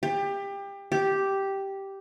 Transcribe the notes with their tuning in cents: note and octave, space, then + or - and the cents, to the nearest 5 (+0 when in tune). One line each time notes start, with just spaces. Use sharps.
G4 +25
G4 -5